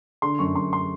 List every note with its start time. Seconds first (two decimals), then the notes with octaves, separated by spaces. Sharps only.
0.22 D3 C6
0.39 F#2 C#6
0.56 F#2 C6
0.73 C6